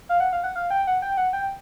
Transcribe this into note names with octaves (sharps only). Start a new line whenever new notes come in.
F5
F#5
F5
F#5
F5
G5
F#5
G5
F#5
G5